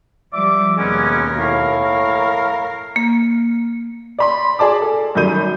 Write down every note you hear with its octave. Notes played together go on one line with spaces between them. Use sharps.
F3 G3 D5 E5 D6
D#2 B2 G#3 B3 C#4 A#4
A2 C#5 F5
A#4
A#3
D5 B5 C6
G#4 D5 A5 D6
A4
F#2 D#3 G3 G6 D#7